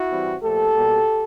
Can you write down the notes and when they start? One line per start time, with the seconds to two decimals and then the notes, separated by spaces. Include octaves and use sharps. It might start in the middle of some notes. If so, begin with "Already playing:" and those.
Already playing: E4 F#4
0.10 E3 G3 C4
0.42 A#2 F3 A3 G4 A4
0.74 B2 G3 A#3